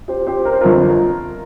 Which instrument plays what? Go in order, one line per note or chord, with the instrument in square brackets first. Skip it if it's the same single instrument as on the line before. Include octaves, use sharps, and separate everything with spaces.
[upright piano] G4 C5
G4 C5
A#4
C5
G1 F2 F3 F4 A#4